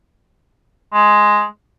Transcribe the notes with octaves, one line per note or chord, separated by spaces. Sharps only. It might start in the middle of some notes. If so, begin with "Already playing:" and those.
G#3